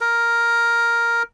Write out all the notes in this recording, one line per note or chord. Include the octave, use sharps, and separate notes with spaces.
A#4